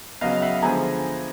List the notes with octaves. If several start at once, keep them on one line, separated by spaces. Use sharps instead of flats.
C#3 F#3 B3 D#5 F5
E5 F#5
D3 F3 G#3 B3 G#5 A#5